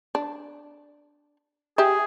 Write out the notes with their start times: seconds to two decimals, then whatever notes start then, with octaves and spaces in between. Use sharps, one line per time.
0.15 D4
1.78 G4 G#4 E5